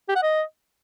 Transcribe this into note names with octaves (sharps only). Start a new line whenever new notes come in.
G4
F#5
D#5